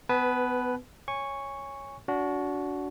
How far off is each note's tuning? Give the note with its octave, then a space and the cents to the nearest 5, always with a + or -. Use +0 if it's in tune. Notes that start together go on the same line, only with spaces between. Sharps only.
B3 +25 B4 +0 A5 -45
C#5 +0 G#5 -15 C#6 +0
D4 -30 F#4 +0